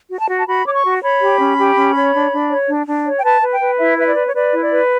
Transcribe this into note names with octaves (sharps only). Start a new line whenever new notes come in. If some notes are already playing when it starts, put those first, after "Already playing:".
F#4
A5
F#4
A5
F#4 B5
C#5 D6
C#6
F#4
C#5 B5
G4
C#4
G4
C#4
C#5
D4
D4
C#5
D4
D4
C#5
G5
B4 A5
B4
G5
B4
E4 E5
B4 E5
D5
B4
C#5
B4 D5
E4
D5
B4